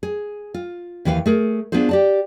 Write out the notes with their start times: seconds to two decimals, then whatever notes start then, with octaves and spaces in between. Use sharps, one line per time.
0.03 G#4
0.54 F4
1.05 D#2 E3 B4 C5 F5
1.26 A3 G#4 A#4
1.72 B3 D4 F4 G#4 C5
1.89 G4 D5 A5